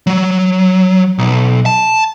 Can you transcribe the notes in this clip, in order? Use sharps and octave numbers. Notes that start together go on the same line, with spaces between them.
F#3
B1
A5